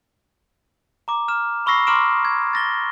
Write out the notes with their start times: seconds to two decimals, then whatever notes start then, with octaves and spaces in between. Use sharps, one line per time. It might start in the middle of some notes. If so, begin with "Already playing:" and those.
1.08 A#5 D6
1.28 F6 E7
1.66 B5 C#6 E6 A#6 C7
1.87 A#5 C6 D6 F6 D7 E7
2.25 G#6
2.53 A6 A#6 G7